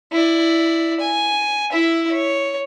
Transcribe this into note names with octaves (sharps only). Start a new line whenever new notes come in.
E4 D5
G#5
E4 E5
C#5